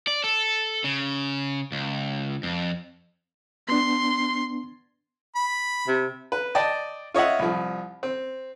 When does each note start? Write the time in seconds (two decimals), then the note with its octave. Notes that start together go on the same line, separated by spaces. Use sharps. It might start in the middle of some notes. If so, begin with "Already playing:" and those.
0.07 D5
0.24 A4
0.84 C#3
1.72 C#2
2.43 F2
3.69 B3 D4 C6
5.36 B5
5.88 C3
6.32 B4
6.55 D5 D#5 G5 A5
7.14 F4 C#5 D#5 E5 F#5
7.39 C2 F3
8.03 C4